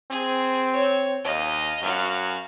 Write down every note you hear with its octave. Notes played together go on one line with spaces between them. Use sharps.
C4 G#4
C#5
D#2 D#5 F5
F#2 F#4 F5